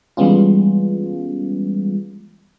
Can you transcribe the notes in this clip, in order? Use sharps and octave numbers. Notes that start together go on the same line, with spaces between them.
E3 G3 G#3 B3 C#4 F4